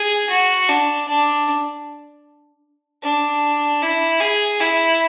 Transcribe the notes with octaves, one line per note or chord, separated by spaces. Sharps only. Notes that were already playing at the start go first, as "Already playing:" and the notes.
Already playing: G#4
F#4
D4
D4
D4
E4
G#4
E4